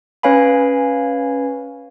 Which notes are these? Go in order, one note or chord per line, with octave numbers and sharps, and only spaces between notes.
C#4 B4 C#5 F5 G#5 B5